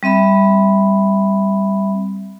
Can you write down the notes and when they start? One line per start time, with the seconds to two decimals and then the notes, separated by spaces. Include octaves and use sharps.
0.03 G3 C4 E5 B5